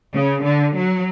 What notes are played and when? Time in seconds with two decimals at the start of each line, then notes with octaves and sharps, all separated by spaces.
0.14 C#3
0.44 D3
0.74 F#3